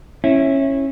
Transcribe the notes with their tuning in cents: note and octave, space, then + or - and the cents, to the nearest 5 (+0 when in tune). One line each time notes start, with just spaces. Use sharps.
C#4 -20 E4 +0